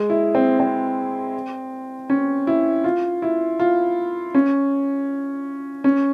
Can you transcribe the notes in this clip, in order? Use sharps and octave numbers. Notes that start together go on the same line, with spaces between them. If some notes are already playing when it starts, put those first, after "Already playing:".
Already playing: G#3
E4
C4
C4
C#4
E4
F4
E4
F4
C#4
C#4